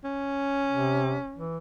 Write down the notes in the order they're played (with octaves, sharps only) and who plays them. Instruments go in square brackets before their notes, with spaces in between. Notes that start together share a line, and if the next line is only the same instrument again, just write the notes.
[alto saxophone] C#4
[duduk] C3
E3